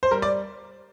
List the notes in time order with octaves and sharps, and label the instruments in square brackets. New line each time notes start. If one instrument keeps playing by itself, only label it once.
[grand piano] C5
G3 A#4
D5